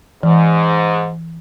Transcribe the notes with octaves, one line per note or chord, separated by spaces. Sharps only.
G#2 E3